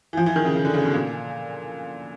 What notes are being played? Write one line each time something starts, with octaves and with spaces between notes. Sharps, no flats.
E3
F3
E3
D#3
C#3
C#3
D3
C#3
B2
A#2